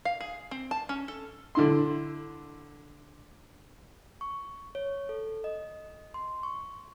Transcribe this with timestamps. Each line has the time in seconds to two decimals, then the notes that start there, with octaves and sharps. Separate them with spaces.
0.05 F5
0.21 G#4
0.51 C4
0.71 A5
0.89 C#4
1.08 A4
1.55 D3 E4 C6
4.21 C#6
4.75 C#5
5.09 A4
5.44 D#5
6.14 C6
6.43 C#6